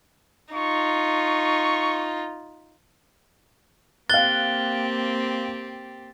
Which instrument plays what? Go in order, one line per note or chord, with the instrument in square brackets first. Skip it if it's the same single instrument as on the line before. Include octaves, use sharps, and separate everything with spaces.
[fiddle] D#4 F4 [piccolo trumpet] C#6
[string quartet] A#3 C4 G4 [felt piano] F5 F#6 [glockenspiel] A6 G7